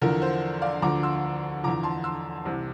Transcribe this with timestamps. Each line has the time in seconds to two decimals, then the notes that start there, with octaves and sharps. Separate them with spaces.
0.01 E2 D3 F3 A#4
0.22 C5
0.62 D5 F5
0.82 D2 D3 F3 A#5 D6
1.03 C6 E6
1.63 E2 D3 F3 A#5 D6
1.83 A5 C6
2.04 C6 E6
2.45 C2 C3 E3